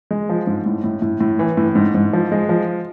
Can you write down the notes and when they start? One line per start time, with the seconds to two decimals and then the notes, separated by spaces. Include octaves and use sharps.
0.11 G#3
0.29 F3
0.47 G#2
0.66 A2
0.84 A2
1.02 A2
1.20 A2
1.39 E3
1.57 A2
1.75 G#2
1.94 G#2
2.13 F3
2.32 G#3
2.49 F3